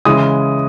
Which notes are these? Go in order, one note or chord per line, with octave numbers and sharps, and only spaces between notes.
C#3 E3 G#3 D#6